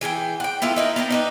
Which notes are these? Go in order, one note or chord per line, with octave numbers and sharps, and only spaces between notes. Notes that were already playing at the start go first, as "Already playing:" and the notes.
E3 G#4 A4 G5
F#5 G5
B3 E4 F4 A4
D#4 E4 A#4
B3 C4 D#4 A#4
D4 D#4 B4